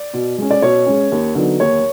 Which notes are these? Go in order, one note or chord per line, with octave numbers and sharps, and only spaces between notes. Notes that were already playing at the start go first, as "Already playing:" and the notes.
Already playing: D5
B2
G#3 C#4
D5
B2 C#5
G#3 C#4
D#2
D3 F#3 B3 D#4
D#2 C#5